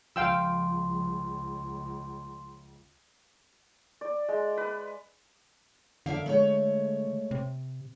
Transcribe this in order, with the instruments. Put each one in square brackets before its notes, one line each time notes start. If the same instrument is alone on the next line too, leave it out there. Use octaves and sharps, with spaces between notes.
[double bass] C#2 [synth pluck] F3 [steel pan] F5 G5 E6 [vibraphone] C6
[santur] D5
G#3
B4
[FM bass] D3 [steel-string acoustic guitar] A#4 E5 F5
[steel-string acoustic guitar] G#3 A3 C#5
[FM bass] C3